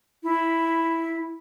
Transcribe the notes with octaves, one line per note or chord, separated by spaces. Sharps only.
E4